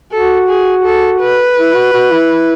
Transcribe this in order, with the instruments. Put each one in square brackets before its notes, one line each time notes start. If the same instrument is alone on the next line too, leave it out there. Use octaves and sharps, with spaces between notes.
[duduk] F#4 [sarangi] A4
[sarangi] G#4
A4
B4
[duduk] E4
F#4
F#4
E4